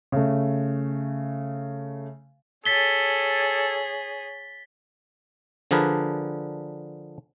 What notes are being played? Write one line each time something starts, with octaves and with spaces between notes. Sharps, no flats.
C#3 A3
G#4 A4 C#5 A6 B6 G7
D3 F3 D4 G#4 A#4 B4